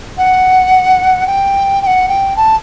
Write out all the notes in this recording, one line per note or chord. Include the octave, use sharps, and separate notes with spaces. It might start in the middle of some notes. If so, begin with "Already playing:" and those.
F#5
G5
G5
F#5
G5
A5